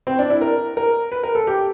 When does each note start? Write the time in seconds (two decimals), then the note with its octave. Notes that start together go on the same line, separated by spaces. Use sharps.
0.07 C4
0.19 D4
0.30 E4
0.41 A#4
0.77 A#4
1.12 B4
1.23 A#4
1.35 A4
1.47 G4